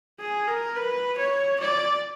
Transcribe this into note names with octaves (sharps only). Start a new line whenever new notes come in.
G#4
A#4
B4
C#5
D5